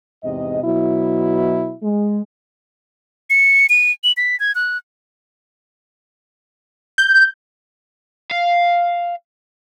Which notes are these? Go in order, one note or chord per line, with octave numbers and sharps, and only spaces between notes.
E2 G#2 C3 D#5
B2 F#3 E4
G#3
C#7
D#7
F#7
B6
G#6
F#6
G6
F5